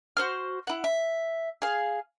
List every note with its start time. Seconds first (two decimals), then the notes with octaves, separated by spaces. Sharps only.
0.17 F#4 C5 F6
0.67 E4 F#5
0.84 E5
1.62 G#4 F5